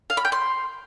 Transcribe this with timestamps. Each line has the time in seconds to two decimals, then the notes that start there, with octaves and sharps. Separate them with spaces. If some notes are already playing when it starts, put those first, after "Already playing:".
0.10 F5
0.17 B5
0.25 G5
0.32 C6